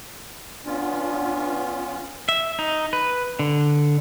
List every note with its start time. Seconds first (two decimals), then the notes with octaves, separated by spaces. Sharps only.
0.66 B3 C#4 D4 F4
2.29 E5
2.59 D#4
2.93 B4
3.39 D3